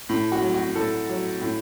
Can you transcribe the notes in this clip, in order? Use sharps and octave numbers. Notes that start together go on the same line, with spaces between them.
A2
F#4
F#3
F#4
A2 A4
F#3
A2